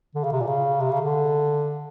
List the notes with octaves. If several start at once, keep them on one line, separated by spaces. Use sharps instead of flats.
D3
C#3
C3
A#2
C#3
C3
C#3
D3